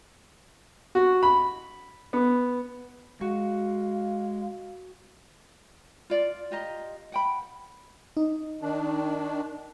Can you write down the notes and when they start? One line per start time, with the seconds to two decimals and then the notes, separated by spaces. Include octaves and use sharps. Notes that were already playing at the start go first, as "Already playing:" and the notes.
0.95 F#4
1.23 B5
2.13 B3
3.21 G#3 F#4 F5
6.10 F4 D5
6.51 F4 G4 D#5 A#5
7.12 F#5 G5 B5
8.17 D#4
8.62 D#3 D4